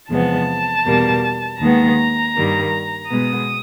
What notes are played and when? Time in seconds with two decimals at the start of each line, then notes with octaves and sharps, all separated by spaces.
0.10 E2 C3 F3 G#3 B3 A5
0.86 E2 B2 G3 A#3
1.60 D#2 D#3 G#3 B3 A#5
2.35 G2 D#3 G3 A#3
3.11 B2 G#3 B3 D#6